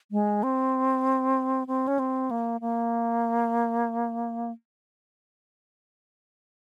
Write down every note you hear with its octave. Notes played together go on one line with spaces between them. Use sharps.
G#3
C4
C4
C#4
C4
A#3
A#3